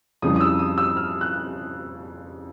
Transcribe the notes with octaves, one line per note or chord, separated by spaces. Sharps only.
F2 C#3 E3 G3 D#6
D#6
E6
D#6
E6
F6
F#6